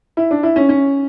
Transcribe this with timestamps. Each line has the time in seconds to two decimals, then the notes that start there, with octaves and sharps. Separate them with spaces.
0.17 E4
0.31 D4
0.43 E4
0.56 C#4
0.69 C#4